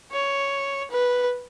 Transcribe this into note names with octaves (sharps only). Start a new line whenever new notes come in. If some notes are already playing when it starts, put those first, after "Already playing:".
C#5
B4